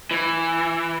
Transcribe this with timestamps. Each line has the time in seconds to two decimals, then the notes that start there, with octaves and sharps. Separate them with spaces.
0.11 E3